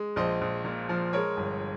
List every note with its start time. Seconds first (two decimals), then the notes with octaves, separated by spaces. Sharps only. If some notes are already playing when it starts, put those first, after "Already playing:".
Already playing: G#3
0.16 A#1 C5 D#5
0.41 A#1
0.65 A#2
0.89 F3
1.13 G#3 A#4 C#5
1.37 G1